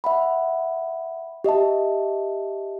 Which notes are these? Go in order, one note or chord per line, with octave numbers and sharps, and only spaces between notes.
E5 F#5 B5
G4 D#5 E5 A5